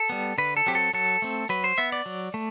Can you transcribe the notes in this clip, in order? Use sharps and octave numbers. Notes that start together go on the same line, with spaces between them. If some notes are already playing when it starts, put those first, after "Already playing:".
Already playing: A4
G3 B3
D3 B4
A4
F#3 C4 G4
A4
F#3 A4
A3 C4
F#3 B4
C5
B3 E5
D5
F#3
A3